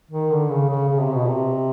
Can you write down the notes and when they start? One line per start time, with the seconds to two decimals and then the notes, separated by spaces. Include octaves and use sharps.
0.11 D#3
0.31 D3
0.50 C#3
0.69 C#3
0.89 C#3
1.01 C3
1.14 B2
1.27 C3